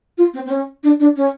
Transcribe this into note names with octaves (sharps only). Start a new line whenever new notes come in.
F4
C4
C4
C#4
D4
D4
C#4